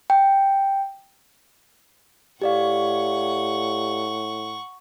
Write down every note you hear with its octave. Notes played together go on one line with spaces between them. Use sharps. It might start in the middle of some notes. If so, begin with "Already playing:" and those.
G5
A2 G4 D5 F5 F#5 C#6